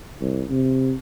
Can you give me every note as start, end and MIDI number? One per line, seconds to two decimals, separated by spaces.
0.21 0.43 36
0.49 0.93 48